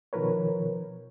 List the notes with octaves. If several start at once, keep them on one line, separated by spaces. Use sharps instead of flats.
B2 D#3 F3 A#4 B4 C#5